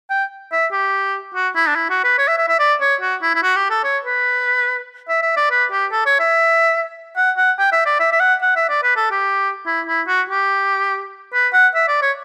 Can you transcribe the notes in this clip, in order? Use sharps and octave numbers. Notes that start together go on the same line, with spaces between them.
G5
E5
G4
F#4
E4
D4
E4
F#4
B4
C#5
E5
E5
E5
D5
C#5
F#4
E4
E4
F#4
G4
A4
C#5
B4
E5
E5
D5
B4
G4
A4
C#5
E5
F#5
F#5
G5
E5
D5
E5
E5
F#5
F#5
E5
D5
B4
A4
G4
E4
E4
F#4
G4
B4
F#5
E5
D5
C#5